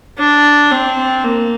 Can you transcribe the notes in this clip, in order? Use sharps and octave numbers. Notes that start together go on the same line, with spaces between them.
D4
C4
A#3